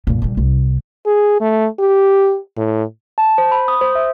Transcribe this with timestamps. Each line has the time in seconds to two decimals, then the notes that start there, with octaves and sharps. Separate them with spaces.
0.07 F#2 A#2
0.22 A#1 G3
0.37 C2
1.06 G#4
1.41 A3
1.79 G4
2.57 A2
3.18 A5
3.38 C5
3.52 B5
3.68 D#6
3.81 C5
3.95 E5